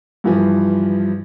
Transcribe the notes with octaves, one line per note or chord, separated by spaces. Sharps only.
G2 E3 F3